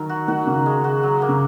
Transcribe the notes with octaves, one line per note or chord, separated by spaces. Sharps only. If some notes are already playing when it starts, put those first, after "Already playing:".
Already playing: D#3 F#3 A#4
F#4
D#3 F#4
C#3 A#3
G#3
F#4
F#3
A#3
C#3